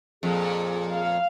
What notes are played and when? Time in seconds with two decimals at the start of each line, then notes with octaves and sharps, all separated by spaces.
0.23 F2 A#2 G#4
0.93 F5